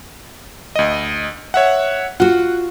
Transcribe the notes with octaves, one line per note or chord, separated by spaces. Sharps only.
D2 D#5
C#5 E5 F#5
F4 F#4 F#5